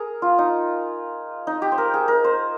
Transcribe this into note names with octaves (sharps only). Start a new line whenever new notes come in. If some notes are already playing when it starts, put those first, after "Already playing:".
Already playing: G#4 A#4
F4
D#4
D#4
G4
C5
A#4
G#4
A#4
C5